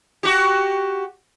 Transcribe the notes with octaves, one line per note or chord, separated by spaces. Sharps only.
F#4 G4